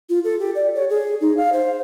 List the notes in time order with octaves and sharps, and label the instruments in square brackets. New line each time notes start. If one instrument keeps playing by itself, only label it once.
[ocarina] F4
A4
G4
D5
C#5
G#4
D#4
F5
C5